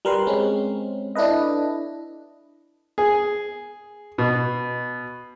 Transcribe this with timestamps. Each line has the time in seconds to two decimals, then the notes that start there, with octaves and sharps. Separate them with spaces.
0.05 G3 A#4 B4 C6
0.27 G#3 C4 C#4
1.15 D4 E4 A4 B4 D#5
2.98 G#4
4.18 B2